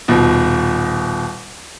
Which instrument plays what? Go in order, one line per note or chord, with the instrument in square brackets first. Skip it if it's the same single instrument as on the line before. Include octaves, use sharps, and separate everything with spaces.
[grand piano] D#1 B2